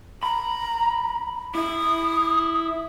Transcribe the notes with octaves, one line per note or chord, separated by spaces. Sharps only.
A#5 B5
E4 D#6